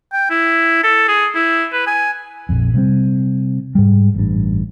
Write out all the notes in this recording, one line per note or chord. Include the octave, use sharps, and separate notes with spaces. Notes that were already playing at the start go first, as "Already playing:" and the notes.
G5
E4
A4
G#4
E4
B4
G#5
A#1 F2
C3 G3 C4
G#2 G3
A1 G2